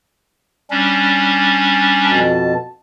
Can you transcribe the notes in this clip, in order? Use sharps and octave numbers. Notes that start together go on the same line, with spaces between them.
G3 C#4 D4
F2 B2 A5